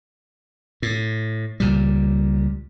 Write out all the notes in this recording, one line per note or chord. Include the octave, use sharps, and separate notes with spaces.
A2
C#2 A#2 G3